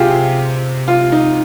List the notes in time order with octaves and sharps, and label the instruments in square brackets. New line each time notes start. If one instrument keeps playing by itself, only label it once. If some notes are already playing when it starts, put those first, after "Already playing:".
Already playing: [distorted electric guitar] C3 [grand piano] F4 G4 G#4
[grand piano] F4
D#4